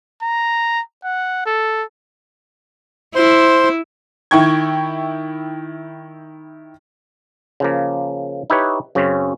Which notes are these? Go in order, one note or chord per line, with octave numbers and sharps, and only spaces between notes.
A#5
F#5
A4
E4 C5 C6
D#3 E4 G5 C#6 G#6
C#3 F3 A#3
D#4 E4 G4 B4 C#5
F#2 C#3 C4 C#4